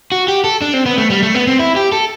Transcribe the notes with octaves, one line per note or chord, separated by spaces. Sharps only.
F#4
G4
A4
D4
C4
B3
A3
G3
A3
B3
C4
E4
G4
A4